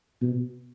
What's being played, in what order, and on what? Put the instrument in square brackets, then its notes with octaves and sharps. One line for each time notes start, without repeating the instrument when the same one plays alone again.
[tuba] B2